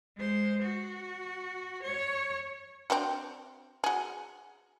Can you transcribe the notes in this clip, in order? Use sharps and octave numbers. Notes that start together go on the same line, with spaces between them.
G#3 C5
F#4
C#5
C4 D4 F#4
F#4 G#4